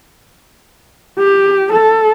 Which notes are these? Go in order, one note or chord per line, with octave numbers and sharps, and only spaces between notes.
G4
A4